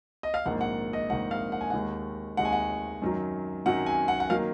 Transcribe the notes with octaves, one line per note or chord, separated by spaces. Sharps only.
D#5
F5
A#1 G#2 D#3 A#3 F#5
F#5
D#5
A#1 G#2 D#3 A#3 F#5
F5
F#5
G#5
D#2 D#3 G#3 F#5
D#2 D#3 G#3 F#5
G#5
F#5
F#2 D#3 F#3
F#2 D#3 F#3 F#5
G#5
F#5
F#5
D#3 F#3 A#3 F5